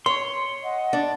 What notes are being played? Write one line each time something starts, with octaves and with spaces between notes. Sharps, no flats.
C#5 C6
D#5 F#5
D4